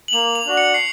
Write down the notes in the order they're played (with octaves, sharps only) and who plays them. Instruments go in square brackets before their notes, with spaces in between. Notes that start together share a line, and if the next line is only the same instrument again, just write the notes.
[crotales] F#7
[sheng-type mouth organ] A#3 [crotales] F7
[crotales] F7
[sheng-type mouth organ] D4 F#4
[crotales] C#7
C7